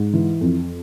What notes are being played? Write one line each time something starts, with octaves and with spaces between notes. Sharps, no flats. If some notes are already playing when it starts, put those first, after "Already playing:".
Already playing: G#2
E3
F2